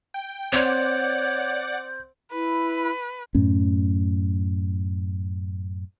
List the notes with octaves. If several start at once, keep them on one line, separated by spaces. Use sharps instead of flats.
G5
C4 C#5 D5 F#5 G6
E4 B4
F#2 A2 C#4